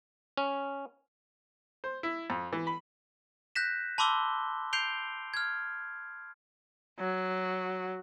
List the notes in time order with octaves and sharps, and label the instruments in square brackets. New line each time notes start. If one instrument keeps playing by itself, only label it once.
[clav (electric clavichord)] C#4
[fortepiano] C5
E4
F2
E3
B5
[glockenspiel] F#6 G6 A#6 B6 E7
A5 B5 C6 D6 E6 G7
G6 C7 D7 F7 G7
F6 G#6
[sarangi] F#3